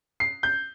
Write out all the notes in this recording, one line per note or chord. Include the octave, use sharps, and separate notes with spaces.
C7
G6